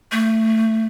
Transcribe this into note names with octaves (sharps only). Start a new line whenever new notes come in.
A3